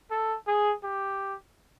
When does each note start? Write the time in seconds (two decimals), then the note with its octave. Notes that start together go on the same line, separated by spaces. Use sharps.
0.11 A4
0.47 G#4
0.84 G4